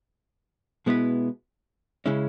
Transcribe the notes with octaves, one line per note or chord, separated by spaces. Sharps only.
B2 G#3 B3 E4 B4
C#3 G#3 C#4 E4